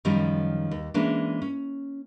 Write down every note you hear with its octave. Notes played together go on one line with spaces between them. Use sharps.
F#2 D#3 F3 G3 C#4
D#2
E3 G#3 A#3 C#4 D4
C#4